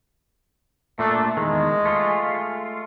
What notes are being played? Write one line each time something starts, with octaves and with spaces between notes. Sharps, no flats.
A#2 A3 D4
E2 D#3 G#3
A3 F4